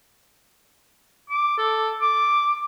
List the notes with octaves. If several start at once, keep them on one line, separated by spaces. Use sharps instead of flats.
D6
A4
D6